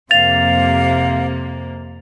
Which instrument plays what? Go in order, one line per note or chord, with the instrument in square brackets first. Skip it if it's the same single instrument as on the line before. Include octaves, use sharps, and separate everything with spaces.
[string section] F2 C3 A#3 [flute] F5 [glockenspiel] A6 F7